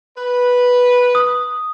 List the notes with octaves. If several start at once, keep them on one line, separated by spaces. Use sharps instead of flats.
B4
D#6